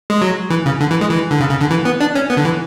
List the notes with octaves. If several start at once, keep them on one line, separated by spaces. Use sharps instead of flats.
G#3
F#3
E3
C#3
D3
E3
G#3
E3
D3
C#3
C#3
D3
E3
B3
D4
C#4
B3
D3
E3